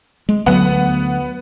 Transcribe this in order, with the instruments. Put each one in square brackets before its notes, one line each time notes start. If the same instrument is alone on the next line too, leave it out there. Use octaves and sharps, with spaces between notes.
[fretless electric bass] G#3
[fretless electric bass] D2 F#3 [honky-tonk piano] B3 F#5